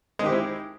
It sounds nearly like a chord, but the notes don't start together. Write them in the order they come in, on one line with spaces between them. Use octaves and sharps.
G#3 D#3 G4 C4 E4